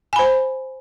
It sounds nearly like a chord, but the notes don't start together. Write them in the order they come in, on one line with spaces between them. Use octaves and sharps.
G#5 B5 C5